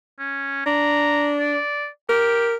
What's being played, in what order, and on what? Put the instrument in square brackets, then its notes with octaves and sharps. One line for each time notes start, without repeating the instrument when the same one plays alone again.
[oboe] C#4
[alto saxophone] D4 [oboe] A#5
[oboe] D5
[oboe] G4 [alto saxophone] A#4